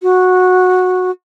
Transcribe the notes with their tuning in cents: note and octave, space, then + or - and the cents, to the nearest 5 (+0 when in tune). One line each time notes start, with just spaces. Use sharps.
F#4 -15